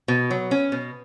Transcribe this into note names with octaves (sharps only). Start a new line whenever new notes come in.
B2
F#3
C#4
B2